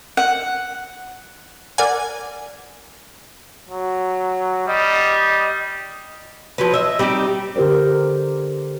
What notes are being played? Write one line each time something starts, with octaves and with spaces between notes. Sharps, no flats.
F#5
A#4 D5 F#5 G#5
F#3
G3 D#5
F3 F#3 B4
D#5 E5
G3 C4 D#4 G4
D3 G4 A#4 C5 D5